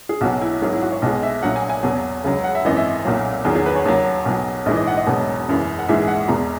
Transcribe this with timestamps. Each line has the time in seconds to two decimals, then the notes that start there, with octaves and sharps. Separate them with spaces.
0.09 G#4
0.21 B1 B2 F#3 F#4
0.41 E4
0.61 G#1 G#2 F#3
0.73 E4
0.82 F#4
0.92 C#5
1.02 B1 B2 G#3 D#5
1.23 E5
1.43 A#1 A#2 F#3 F#5
1.56 G#5
1.70 G#5
1.83 E2 B2 F#3
2.24 C#2 C#3 F#3
2.44 F#5
2.55 E5
2.65 G#1 F#2 E3 D#5
2.77 E5
3.05 B1 A#2 F#3
3.45 E2 D#3 F#3 G#4
3.55 G#4
3.66 B4
3.76 C#5
3.86 D#2 C#3 F#3
4.26 B1 B2 F#3
4.66 A#1 G#2 E3 D#5
4.77 D#5
4.87 F#5
4.97 D#5
5.07 E1 E2 B2 F#3
5.48 F#1 F#2 C#3 E3
5.79 F#5
5.89 A#1 G#2 E3 G#3 E5
6.08 F#5
6.28 E2 B2 G#3 A#5